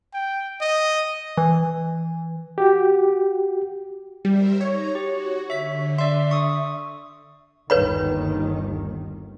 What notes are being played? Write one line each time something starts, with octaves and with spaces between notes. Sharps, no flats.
G5
D#5
E3
F#4 G4
G3 A#4 C5 E5
D#4 C#5 A#5
F#4 G4
D3 E5 B6
D5 E5 C6
C#6 D#6
G1 D#2 D#3 B4 C#5 B5